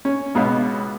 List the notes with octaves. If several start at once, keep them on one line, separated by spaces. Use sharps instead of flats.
C#4
C#2 B2 B3 F5